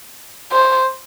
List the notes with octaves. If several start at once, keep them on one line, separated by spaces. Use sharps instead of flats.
C5